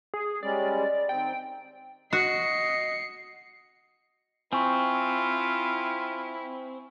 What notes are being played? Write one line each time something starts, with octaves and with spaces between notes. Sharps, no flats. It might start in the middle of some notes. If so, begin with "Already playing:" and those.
G#4
G3 G#3 C#4 D5
D#3 C4 G5
F#4 D#5 C7 C#7
C4 E4 F4 G#5 C#6